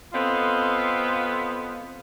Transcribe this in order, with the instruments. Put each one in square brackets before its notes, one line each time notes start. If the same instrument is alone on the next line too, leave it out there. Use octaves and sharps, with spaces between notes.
[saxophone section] B3 C4 F4 A4 D#5 F5